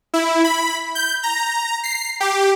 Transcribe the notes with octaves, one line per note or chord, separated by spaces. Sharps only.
E4
B5
G6
A#5
C7
G4